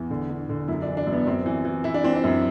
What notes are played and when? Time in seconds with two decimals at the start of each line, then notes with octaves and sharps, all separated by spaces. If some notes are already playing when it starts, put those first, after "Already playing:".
Already playing: E2 E3
0.10 D3
0.30 D3
0.49 D3
0.68 F#2 E4
0.82 D4
0.88 E3
0.97 D4
1.07 F#2
1.12 B3
1.26 F#2 C4
1.46 E3
1.65 E3
1.84 E3 E4
1.94 D4
2.04 E3 C4
2.15 D4
2.24 F#2